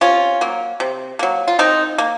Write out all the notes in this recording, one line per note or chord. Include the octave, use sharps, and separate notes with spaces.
C3 C#4 F4
F#3 A#3
C3
F#3 A#3
F4
D#3 C4 D#4
A#3